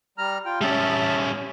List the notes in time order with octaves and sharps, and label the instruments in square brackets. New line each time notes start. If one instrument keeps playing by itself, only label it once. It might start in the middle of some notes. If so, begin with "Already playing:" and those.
[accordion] G3 A#5 F6
F4 G5
[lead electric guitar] G3 C#4 [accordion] E5 A5